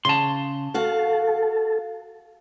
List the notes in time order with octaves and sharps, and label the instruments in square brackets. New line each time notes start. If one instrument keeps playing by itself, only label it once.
[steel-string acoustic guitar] C#3 [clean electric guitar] A5 C6
[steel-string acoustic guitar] F#4 F5 F#5 [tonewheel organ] A4